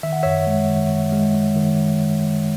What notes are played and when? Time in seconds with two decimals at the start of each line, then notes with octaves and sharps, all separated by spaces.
0.03 D#3 E5
0.13 F#5
0.23 F#2 C#5 E5
0.47 G#3
0.69 D#3
0.91 D#3
1.13 G#3
1.35 G#3
1.56 D#3